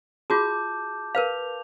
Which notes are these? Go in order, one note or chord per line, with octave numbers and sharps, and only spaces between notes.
F4 F#4 G#4 A5 D6 G6
A#4 B4 F5 F7